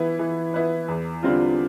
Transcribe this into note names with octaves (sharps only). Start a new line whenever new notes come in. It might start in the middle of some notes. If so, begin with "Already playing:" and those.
Already playing: E3 B3 E4 B4
E3
B3 E4 B4
E2
D3 G3 C4 F4